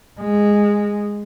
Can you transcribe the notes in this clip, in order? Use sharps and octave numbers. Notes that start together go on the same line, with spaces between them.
G#3